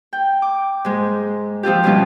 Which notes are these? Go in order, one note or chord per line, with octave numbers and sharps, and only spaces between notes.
G5
D6
G#2 G#3
F3 C4 F4 G4
B2 G3 B3 C#4 E4 F4